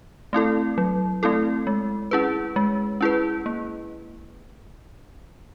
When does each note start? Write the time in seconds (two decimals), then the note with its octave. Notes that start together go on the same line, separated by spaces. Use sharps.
0.33 A3 C4 E4 A4
0.78 F#3
1.23 A3 C4 E4 A4
1.67 G#3
2.11 C#4 E4 G#4 B4
2.56 G#3
3.01 C#4 E4 G#4 B4
3.46 A#3